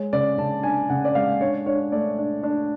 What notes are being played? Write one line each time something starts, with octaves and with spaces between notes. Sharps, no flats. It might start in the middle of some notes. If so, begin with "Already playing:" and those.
Already playing: G#3 C#5
C#3 D5
C#3 A5
D4 G#5
C#3 F#5
D5
G#3 F5
D4 C#5
D4 C#5
A3 D5
D4
D4